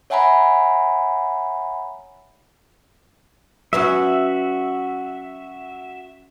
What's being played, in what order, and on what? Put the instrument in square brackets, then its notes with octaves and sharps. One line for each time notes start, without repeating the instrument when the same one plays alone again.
[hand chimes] C#5 E5 F#5 G#5 A#5 B5
[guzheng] F#3 B3 C#4 [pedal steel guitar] F#4 E5